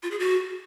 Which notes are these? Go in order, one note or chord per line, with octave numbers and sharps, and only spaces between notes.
F4
G#4
F#4